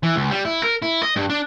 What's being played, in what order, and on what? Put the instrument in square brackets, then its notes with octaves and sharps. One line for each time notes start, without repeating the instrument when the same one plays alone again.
[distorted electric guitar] E3
C#2
G3
E4
A#4
E4
D#5
G2
D4